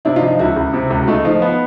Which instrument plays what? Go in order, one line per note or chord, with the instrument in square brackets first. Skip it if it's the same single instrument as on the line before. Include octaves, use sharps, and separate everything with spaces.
[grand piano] C3 [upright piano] D4 E4
[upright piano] D#4 F4
[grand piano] F3
[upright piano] D#4 F4
[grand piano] C#2 [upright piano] E4 F#4
[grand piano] C#2
C3
C#2
[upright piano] F#4
[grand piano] A3 [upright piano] D#4 F4
[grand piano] F3 [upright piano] D#4 F4
[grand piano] B3